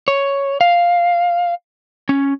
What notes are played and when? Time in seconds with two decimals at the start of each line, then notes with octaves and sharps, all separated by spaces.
0.08 C#5
0.61 F5
2.09 C#4